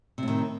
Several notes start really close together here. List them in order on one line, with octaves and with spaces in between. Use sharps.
C3 A2 D#3